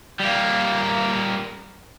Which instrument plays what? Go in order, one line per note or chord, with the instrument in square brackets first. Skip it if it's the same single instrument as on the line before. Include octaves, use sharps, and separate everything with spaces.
[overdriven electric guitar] G3 A#3